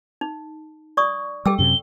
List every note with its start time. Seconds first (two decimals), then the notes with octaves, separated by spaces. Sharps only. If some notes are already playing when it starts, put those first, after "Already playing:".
0.21 D#4
0.97 D5 C#6 D#6
1.46 G3 A4 G5 D6 E6
1.59 F#2 C3 G7